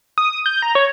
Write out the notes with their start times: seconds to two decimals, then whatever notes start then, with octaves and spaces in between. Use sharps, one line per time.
0.18 D#6
0.46 G6
0.62 A#5
0.75 C#5